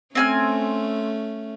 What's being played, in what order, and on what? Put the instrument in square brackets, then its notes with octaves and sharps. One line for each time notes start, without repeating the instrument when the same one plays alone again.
[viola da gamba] A3 C#4 [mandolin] C4 G#5 F6